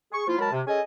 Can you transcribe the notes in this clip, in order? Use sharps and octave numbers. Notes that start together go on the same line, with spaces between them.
G#4 C#6
F3 A#3 E4 F4
F#3 G#3 A#4 A5 B5
C3
C#4 G#4 A4 D#5 G#5